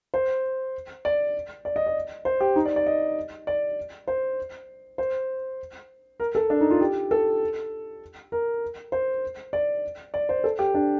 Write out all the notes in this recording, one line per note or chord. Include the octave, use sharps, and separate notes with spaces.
C5
D5
D5
D#5
D5
C5
G4
D#4
D5
D5
D#5
D5
C5
C5
A#4
A4
D4
D#4
F4
G4
A4
A#4
C5
D5
D5
C5
A4
G4
D4